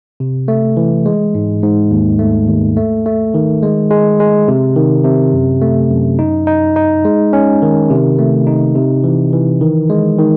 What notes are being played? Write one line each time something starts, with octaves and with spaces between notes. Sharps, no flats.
C3
A3
E3
G#3
G#2
G#2
D#2
A3
D#2
A3
A3
D#3
G#3
G#3
G#3
C3
D#3
C3
F#2
A3
F#2
D#4
D#4
D#4
G#3
C#4
D#3
C3
A3
D#4
C3
E3
E3
D#3
G#3
D#3